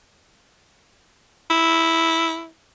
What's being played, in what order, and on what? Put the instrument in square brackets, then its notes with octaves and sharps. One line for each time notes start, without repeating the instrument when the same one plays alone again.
[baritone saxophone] E4